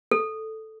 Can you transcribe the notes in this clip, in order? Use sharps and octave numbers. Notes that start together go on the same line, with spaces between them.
A4